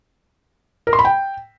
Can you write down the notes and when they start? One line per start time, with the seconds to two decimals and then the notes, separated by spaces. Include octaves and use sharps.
0.87 A#4
0.93 C6
0.99 B5
1.05 G5